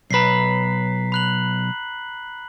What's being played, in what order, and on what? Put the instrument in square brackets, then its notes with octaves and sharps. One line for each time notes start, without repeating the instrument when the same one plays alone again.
[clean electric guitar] B1 B4 [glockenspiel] A#5 B6 C7
[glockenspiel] B5 F#6 F#7